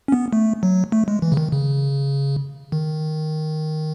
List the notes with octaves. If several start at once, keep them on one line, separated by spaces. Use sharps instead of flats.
C#4
B3
A3
F#3
A3
G#3
E3
C#3
D#3
C#3
D#3